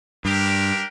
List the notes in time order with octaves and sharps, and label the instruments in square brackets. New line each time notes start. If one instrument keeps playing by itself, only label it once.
[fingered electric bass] G2 [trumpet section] D4 G4 A#4